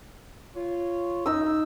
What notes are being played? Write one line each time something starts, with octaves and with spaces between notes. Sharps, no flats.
F4 C#5
F#2 D#4 E6